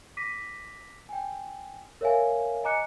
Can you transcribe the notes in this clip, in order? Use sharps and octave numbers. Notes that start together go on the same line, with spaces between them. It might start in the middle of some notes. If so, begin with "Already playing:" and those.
D6 A#6 B6 D#7
G5 G#5
A#4 C#5 E5 F5 G#5
D#5 G#5 A#5 D6 F#6 C#7